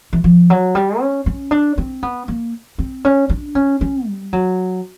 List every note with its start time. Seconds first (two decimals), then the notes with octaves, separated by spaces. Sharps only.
0.13 E3
0.24 F3
0.50 F#3
0.75 G3
1.00 C#4
1.26 C#4
1.51 D4
1.78 C4
2.03 B3
2.28 A#3
2.78 C4
3.05 C#4
3.29 D4
3.55 C#4
3.81 C#4
4.07 G3
4.33 F#3